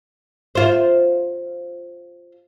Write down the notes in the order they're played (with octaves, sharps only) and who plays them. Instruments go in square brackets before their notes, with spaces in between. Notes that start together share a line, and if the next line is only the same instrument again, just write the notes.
[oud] F4 C5